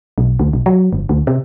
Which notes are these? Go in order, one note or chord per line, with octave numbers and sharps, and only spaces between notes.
B1
D2
B1
F#3
G1
D2
C3